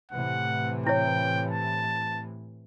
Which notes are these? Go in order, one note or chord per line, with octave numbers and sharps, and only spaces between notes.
A2 C3 E3 F#5
E4 C#5 G5
A5